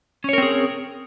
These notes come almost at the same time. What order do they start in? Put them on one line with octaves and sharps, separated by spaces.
C#4 C#5 A#4 C4 G#4